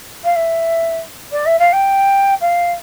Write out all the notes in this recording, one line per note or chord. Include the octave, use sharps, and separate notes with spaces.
F5
E5
D5
E5
F5
G5
F5